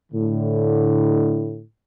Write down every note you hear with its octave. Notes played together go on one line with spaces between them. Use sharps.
A2 D3